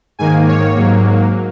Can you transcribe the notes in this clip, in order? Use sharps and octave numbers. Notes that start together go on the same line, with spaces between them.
G#2 D#3 A#3 G#5
C#5
G#2 F#3 A#3